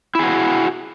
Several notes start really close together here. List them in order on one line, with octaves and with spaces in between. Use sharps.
E4 G#4 F#4